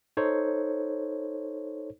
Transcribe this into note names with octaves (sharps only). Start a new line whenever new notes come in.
D#4 A4 C5 C#5